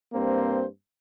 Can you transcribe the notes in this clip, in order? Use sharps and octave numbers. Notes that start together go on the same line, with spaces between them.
G2 A#3 C4 C5